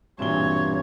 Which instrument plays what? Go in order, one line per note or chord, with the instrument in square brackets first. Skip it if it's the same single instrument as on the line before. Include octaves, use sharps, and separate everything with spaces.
[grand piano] E1 A#2 G7 [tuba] G2 [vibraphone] C4 [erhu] C#5